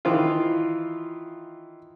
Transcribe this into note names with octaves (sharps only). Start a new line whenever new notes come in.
D#3 E3 F4